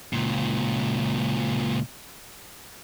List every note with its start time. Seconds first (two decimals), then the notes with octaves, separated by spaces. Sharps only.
0.13 C#2 A#2